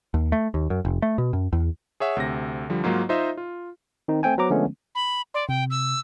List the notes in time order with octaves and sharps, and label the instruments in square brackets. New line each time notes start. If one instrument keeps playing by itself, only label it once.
[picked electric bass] D#2
A3
D#2
F#2
F1
A3
B2
F#2
E2
[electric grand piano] G#4 C#5 E5 F#5
D2 C3 A#6
D3 F3 G3
G#2 F#3 A#3 D#4 F4
D#4 F4 C5 D#5 E5
F4
[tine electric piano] D#3 C4 D#4
A3 C4 G5 G#5
F#3 B3 C5 A#5 D6
D3 F3 G#3 A3 B3 C#4
[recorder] B5
[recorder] D5 [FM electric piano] C6
[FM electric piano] C3 [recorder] G5
[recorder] E6